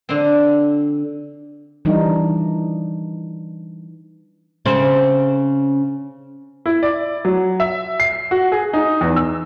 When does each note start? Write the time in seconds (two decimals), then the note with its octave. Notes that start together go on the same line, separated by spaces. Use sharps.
0.09 D3 C4
1.85 E3 G3 D4 D#4
4.65 C#3 C4
6.66 E4
6.83 D5
7.25 F#3
7.60 E5
8.00 C7
8.31 F#4
8.52 G#4
8.73 D#4
9.01 E2
9.16 E6